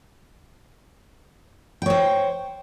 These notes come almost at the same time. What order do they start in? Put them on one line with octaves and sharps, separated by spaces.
G5 C#5 C5